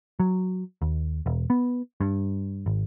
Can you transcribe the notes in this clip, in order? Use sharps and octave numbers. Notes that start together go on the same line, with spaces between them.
F#3
D#2
E1
B3
G2
G#1